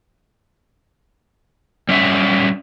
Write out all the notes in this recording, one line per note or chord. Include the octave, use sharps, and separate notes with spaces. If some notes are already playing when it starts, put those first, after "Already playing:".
G3 C#4 E5